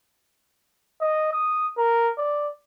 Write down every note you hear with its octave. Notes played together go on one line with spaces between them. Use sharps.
D#5
D#6
A#4
D5